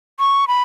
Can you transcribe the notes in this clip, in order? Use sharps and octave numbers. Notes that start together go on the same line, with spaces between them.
C#6
B5